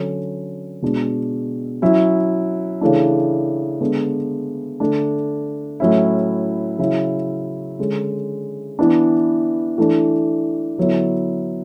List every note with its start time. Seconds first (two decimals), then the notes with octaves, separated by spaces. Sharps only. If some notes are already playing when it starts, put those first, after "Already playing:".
Already playing: D3 F#3 C#4
0.82 B2 G#3 D4
1.82 F#3 C#4 E4
2.81 C#3 E3 A3 D4
3.81 D3 G#3 B3 D4
4.80 D3 A3 D4
5.80 A2 F#3 C#4 E4
6.79 C#3 F#3 C#4 E4
7.79 D3 G#3 C#4
8.79 E3 B3 D4
9.78 E3 A3 D4
10.78 D3 F#3 B3 E4